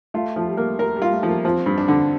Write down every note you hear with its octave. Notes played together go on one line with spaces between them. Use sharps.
A3 F4
F3
G3
A#3
A#4
G3
F4
A3
F3
A#3
F3 C4
G2
D4
D3